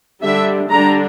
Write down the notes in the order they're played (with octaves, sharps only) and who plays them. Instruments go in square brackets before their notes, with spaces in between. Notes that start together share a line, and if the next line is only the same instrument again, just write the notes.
[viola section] D3 G3 D4 E5
D3 G3 D4 A#5